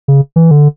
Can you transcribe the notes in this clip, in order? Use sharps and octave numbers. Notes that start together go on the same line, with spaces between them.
C#3
E3
D3